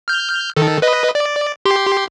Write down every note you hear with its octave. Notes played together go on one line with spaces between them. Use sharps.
F6 G6
D#3 A4
B4 D#5
D5
G4 C6